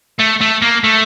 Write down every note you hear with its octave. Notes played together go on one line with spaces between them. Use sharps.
A3
A3
A#3
A3